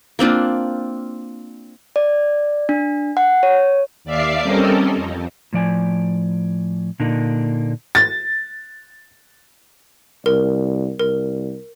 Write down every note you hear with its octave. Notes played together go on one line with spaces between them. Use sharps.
A#3 C4 D4 F4
D5
D4
F#5
C#5
D#2 D5 E5 F5 D6 C7
G3 C4 C#4 A4 A#4 D#5
F2
A2 F3 D5 G#5
A#2 D3 A#3 D4 D#4
A6
C2 A#4
C2 A#4